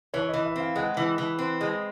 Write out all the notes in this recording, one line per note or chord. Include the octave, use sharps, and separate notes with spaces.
E3 C#5
D#5
E3
E5
C4 F5
G#3 F#5
E3
E3
C4
G#3